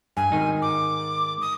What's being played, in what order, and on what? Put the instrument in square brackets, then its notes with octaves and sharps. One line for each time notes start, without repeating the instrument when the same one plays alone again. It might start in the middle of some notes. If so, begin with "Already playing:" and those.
[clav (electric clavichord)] G2 [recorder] G#5
[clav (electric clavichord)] G#2 D#3 D#4
[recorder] D6
D#6